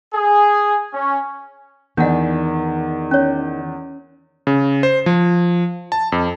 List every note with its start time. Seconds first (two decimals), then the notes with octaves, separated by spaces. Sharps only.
0.14 G#4
0.93 C#4
1.97 E2 D#3 D4 D5 F#5
3.11 C#4 C#5
4.47 C#3
4.83 C5
5.06 F3
5.92 A5
6.12 F2